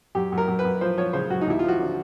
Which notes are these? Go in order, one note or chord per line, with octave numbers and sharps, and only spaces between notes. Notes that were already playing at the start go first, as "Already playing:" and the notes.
F#2 G4
F#2
A#4
F#2
B4
F#2
F3 C5
F3 C#5
C#3 C5
F#2 F#4
D#4
D#2 E4
F4
F3 F#4
D3